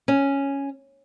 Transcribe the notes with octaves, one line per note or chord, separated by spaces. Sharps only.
C#4